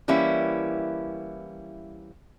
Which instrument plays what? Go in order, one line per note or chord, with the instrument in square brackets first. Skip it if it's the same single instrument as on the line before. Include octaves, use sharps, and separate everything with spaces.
[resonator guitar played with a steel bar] E3 G3 A#3 C#4 E4